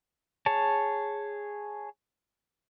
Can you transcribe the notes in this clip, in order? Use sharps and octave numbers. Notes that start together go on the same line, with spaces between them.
G#4 C#5 A5